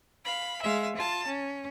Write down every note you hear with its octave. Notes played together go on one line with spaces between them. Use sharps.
F5 B5
G#3 E5 F5
F4 A5
C#4